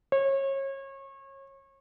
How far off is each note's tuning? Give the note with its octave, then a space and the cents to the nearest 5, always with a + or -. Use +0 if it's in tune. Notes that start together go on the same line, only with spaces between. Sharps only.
C#5 -30